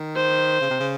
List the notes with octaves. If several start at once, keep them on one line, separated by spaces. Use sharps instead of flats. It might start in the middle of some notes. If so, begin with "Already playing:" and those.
Already playing: D#3
C5
C#3
C3
C#3